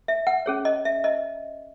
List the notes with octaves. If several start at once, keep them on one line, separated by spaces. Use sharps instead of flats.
E5
F#5
C#4 G#4 C#5
D#5
E5
D#5